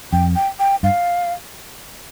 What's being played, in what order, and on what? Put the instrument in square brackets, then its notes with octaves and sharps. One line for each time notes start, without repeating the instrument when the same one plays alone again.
[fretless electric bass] F2 [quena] G5
[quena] G5
G5
[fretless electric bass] G2 [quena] F5